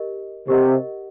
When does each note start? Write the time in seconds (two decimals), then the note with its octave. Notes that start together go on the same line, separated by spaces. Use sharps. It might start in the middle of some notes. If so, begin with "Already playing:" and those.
Already playing: G4 A#4 D#5
0.48 C3 G4 A#4 D#5 F#5